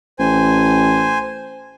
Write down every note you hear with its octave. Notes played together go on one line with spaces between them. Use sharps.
A1 C5 G#5